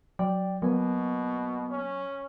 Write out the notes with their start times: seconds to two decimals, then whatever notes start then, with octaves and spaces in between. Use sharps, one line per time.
0.19 F#3 D5 G5
0.62 B2 F#3 A#3 B3 G#5
1.71 C#4